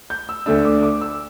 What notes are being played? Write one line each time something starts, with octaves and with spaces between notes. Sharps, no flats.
G6
E6
D2 D3 A3 D4 E6
D6
D6
E6